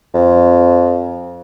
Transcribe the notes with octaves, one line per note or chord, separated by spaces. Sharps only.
F2